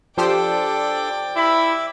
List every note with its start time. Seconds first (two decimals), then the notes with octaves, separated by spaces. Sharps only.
0.18 F3 D4 G4 A4 C5 D5 G5
1.36 E4 E5 B5 D6